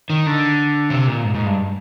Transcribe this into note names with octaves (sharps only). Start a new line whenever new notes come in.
D#3
D3
C3
A#2
G#2
G#2
G2